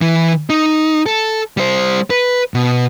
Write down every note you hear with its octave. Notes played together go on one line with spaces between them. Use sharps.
E3
D#4
A4
G3 C5
B4
B2